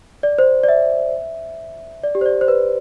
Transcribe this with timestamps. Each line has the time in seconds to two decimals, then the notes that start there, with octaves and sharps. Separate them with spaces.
0.23 D5
0.39 C5
0.64 D5
0.69 E5
2.03 D5
2.15 G4
2.21 C5
2.26 D5
2.41 C5
2.48 B4